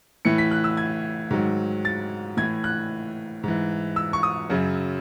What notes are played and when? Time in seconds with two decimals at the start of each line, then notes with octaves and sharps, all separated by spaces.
0.25 A2 E3 C#7
0.38 B6
0.51 F#6
0.64 E6
0.77 G#6
1.30 G#2 D#3 F#3
1.85 A6
2.37 A2 E3 G#6
2.64 F#6
3.43 G#2 E3
3.96 E6
4.13 C#6
4.23 D#6
4.49 F#2 C#3 F#3